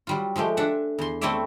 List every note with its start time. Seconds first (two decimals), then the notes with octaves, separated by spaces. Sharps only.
0.07 F#3 G3 F4
0.36 F3 G#3 A3 G4
0.57 D4 E5 F#5
0.98 E2 C6
1.21 A3 C4 E4 C#5 D5 E5